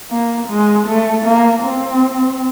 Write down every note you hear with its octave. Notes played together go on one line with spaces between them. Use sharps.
A#3
G#3
A3
A#3
C4